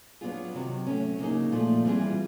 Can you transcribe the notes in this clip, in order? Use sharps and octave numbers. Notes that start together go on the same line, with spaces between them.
F#3 B3 D4 F4 G#4
C3 D#3 F#3
F#3 A3 C#4
C#3 F#3 A#3 D#4 G#4
A#2 F3 A3
E3 G3 C4 F4 G#4